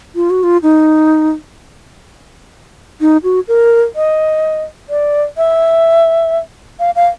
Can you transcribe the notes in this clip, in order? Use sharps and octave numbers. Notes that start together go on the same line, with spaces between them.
F4
F#4
F4
D#4
D#4
F#4
A#4
D#5
D5
E5
F5
F5